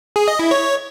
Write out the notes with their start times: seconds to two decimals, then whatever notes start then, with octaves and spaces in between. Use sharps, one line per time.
0.16 G#4
0.28 D#5
0.39 E4
0.51 C#5